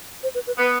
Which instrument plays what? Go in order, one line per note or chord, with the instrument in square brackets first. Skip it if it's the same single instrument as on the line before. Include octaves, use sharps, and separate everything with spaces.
[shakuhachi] C5
B4
B4
[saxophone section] B3 [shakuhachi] B4